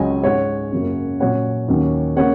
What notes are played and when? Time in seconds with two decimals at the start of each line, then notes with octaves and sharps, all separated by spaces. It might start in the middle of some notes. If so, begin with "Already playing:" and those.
Already playing: C#2 C#3 F#3 C#4 D#5 G#5
0.24 G#2 G#3 C#4 C#5 F#5
0.72 F#2 C#3 F#3 A#3 C#4
1.20 A#2 F#3 C#4 C#5 F#5
1.68 D#2 D#3 F#3 C#4
2.16 C#3 A#3 C#5 F#5